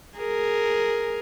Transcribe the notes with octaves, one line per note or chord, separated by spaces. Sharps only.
G#4 A#4